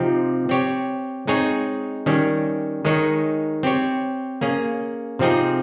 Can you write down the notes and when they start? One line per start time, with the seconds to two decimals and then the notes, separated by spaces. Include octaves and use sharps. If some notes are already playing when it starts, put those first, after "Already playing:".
Already playing: C3 F3 C4 D#4 G4
0.49 C4 G4 C#5
1.27 G#3 C4 D#4 G#4 C#5
2.06 D#3 G3 C#4
2.85 D#3 G#3 D#4 G#4 C#5
3.63 C4 G4 C#5
4.41 A#3 C#4 G#4
5.19 C3 F3 C4 D#4 G#4